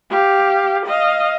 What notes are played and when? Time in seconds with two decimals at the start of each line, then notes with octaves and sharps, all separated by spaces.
0.10 G4 F5
0.86 D#5 F5